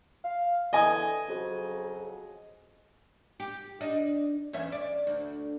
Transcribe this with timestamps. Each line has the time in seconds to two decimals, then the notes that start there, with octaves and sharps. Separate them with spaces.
0.25 F5
0.73 D3 E3 D#5 G#5 D#6
1.29 F2 C#3 F#3
3.40 G4
3.81 D4 D#4
4.53 E2 C#4 E5
4.72 D5
5.07 D2